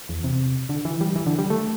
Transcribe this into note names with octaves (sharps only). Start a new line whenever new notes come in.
E2
C3
D3
E3
G3
E3
D3
G3
A3